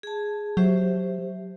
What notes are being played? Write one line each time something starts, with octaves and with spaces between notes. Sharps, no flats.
G#4 A5
F#3 G4 C5 E5